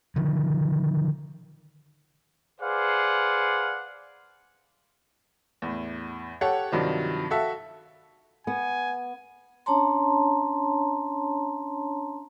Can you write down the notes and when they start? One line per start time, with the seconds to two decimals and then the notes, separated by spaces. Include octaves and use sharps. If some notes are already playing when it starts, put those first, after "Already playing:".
0.16 D3 D#3 F3
2.61 G#4 B4 C5 D5 F5 F#5
5.62 E2 A2
6.41 G4 A4 C#5 F#5
6.72 G2 C3 D#3 F3 F#3
7.30 F#4 A4 E5 F5
8.47 B3 G#5
9.66 C#4 D4 C#5 A5 A#5 C6